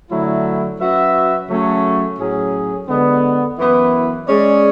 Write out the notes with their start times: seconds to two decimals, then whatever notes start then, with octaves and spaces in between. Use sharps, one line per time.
0.10 D3 F#3 A3 E4
0.78 F#3 C#4 F#4 B4 E5
1.48 C#3 F#3 A3 C#4
2.18 A2 F#3 C#4 G#4
2.88 D3 G#3 B3
3.58 F#2 E3 B3 E4 B4
4.27 G#3 C#4 G#4 D5